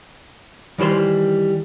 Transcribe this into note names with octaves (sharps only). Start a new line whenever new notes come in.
D#3 E3 G3 C5 C6